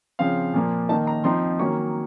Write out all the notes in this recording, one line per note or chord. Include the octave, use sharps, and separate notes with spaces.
C#3 F3 C4 F5
A#2 F3 A#3
D#3 A#3 D#4 A5
A#5
F3 C4 D#4 C6
D#3 F#3 A#3 C#4 C#6